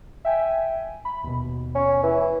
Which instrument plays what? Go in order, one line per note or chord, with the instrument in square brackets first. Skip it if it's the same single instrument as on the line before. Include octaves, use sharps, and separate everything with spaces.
[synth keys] E5 G5 G#5
B5
D#2 B2
[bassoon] C#4
E3